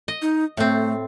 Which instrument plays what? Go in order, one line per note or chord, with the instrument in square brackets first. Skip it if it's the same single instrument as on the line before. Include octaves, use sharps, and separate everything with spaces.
[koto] D#5
[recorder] D#4
[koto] A2 C4 [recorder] A3